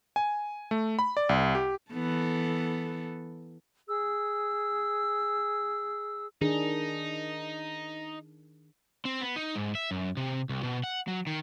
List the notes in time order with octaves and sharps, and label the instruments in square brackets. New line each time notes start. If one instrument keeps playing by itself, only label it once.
[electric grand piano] G#5
A3
B5
D5
C2
G4
[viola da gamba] E3 B3 A4
[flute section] G#4 E6
[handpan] D#3 D4 G#4 [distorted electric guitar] D#4
[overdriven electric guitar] C4
B3
D#4
G#2
E5
F#2
C3
C2
B2
F#5
F#3
D#3